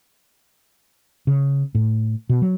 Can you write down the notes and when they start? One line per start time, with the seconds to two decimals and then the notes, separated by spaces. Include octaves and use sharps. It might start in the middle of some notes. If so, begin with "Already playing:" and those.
1.27 C#3
1.75 A2
2.29 B2
2.42 F#3